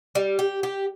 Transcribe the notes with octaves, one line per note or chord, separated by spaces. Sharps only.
G3
G4
G4